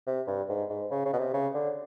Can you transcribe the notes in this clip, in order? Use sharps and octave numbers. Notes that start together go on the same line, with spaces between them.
C3
G2
G#2
G#2
C#3
C#3
B2
C3
C#3
D3